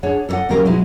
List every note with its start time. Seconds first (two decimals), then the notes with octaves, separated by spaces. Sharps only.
0.03 D4 G#4 C#5 F#5
0.29 A4 A#4 C#5 D#5 F#5
0.49 D#2 C#3 F#3 G4 A#4 F5
0.65 B2 F#3 G#3 D#4 E4